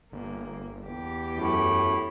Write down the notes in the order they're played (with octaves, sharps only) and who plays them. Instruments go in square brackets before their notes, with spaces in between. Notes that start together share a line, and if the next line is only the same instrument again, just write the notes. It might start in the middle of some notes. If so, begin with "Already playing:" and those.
[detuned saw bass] G1 [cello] A#3
[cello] E2 G4
[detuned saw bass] F#2 [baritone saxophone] A2